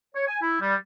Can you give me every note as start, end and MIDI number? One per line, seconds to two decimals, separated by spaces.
0.14 0.26 73
0.28 0.37 80
0.41 0.58 64
0.60 0.75 55